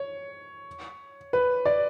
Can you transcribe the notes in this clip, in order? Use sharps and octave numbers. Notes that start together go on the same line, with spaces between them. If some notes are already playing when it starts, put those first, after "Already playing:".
Already playing: C#5
B4
D5